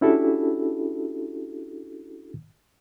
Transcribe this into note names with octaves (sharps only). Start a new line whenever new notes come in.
C#4 D4 E4 F#4 G4 A4